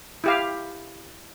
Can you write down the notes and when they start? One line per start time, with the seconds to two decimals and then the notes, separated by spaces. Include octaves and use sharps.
0.24 E4 G4 F5